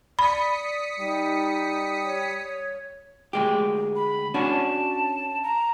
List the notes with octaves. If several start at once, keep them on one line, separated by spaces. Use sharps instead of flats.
D5 B5 D#6 B6 C#7
G3 D#4
C#5
D2 G#3 G4
B5
C#4 D4 F#4 A5
A#5